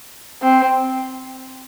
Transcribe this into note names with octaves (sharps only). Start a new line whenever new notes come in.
C4